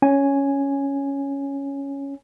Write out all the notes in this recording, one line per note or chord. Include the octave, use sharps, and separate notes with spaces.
C#4 G#5